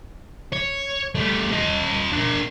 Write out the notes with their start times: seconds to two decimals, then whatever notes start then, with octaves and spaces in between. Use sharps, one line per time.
0.52 C#5
1.15 G3 A3
1.52 F4 D#5
2.12 D4 A#4